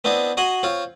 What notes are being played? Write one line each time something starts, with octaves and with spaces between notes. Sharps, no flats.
B3 C4 D4 E4 D#5
F#4 D#5 F#5 G#5 C6
C4 F4 C#5